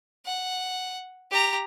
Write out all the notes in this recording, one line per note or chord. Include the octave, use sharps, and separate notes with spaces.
F#5
G4 A#5